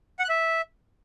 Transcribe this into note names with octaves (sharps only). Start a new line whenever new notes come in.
F#5
F#6
E5